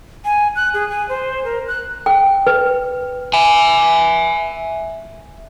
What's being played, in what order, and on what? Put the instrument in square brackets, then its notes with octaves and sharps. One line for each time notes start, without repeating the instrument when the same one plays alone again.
[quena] G#5
F#6
G#4
G#5
C5
A#4
F#6
[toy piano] G5
B4
[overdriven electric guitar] E5 G#5